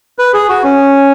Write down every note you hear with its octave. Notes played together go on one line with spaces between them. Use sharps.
B4
G#4
F#4
C#4